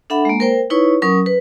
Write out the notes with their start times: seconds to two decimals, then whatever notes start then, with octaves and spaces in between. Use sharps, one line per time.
0.10 D4 A4 E5 F#5 B5
0.25 G#3 A#3
0.40 A#4 C5 G5
0.70 D#4 E4 B4 C#5 C#6
1.02 F#3 C#4 A#4 C#6 D#6
1.26 B4